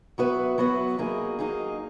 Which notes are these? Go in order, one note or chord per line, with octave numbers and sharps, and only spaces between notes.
F#3 B3 F#4 B4 E5
F#3 B3 F#4 B4 E5
F#3 A#3 D#4 G#4
F#3 A#3 D#4 G#4